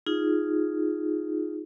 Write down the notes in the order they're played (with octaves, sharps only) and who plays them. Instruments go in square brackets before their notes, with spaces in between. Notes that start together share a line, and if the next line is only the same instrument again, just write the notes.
[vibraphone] D#4 F4 G#4